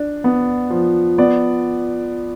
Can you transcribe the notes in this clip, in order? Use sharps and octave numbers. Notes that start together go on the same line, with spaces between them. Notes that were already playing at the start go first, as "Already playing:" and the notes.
Already playing: D4
B3
F3
B3 D5